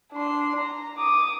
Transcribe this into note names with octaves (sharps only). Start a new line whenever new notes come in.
D4 C6
A#5
D6 D#6